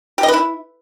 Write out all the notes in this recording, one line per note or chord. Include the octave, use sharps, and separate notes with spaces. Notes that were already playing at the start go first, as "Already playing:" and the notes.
G4
D#5
B4
E4